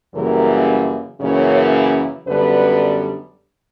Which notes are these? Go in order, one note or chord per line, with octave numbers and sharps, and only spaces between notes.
F#2 C#3 E3 G3 A#3 A#4
F#2 C#3 E3 A#3 C#5
F#2 D3 G3 B3 B4